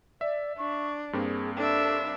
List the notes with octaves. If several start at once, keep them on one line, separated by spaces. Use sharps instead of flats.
D5 E5
D4 C#6
G2 A#3 C4 G#4
D4 A4 E5